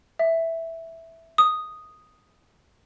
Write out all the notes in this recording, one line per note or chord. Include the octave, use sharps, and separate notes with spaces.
E5
D#6